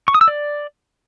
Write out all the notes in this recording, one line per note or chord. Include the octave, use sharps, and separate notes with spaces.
C#6
D#6
E6
D5